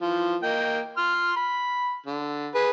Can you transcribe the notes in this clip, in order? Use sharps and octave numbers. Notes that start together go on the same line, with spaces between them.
E3 F3
A#3 D#5 G5
C6 F6
B5
D3
G#4 B4